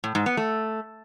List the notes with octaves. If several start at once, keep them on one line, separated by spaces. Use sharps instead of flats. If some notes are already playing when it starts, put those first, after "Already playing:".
A2
G#2
B3
A3